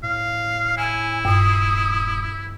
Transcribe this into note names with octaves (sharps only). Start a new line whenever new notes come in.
A2 F5
E4 G#5
D#1 G2 D#6